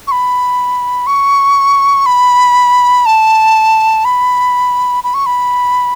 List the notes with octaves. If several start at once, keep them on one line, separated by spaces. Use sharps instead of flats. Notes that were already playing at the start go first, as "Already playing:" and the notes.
C#6
B5
C#6
B5
A5
B5
B5
C#6
B5